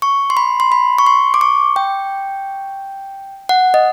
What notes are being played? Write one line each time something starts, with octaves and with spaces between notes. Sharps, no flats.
C#6
C6
B5
C6
B5
C#6
C6
D6
C#6
G5
F#5
D#5